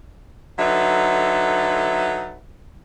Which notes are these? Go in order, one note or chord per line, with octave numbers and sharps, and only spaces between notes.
D3 F#3 D#4 A4 B4 E5